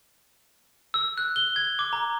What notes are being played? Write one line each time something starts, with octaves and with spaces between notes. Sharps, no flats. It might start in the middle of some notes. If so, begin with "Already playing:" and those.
E6
F#6
G7
G#6
D6
A#5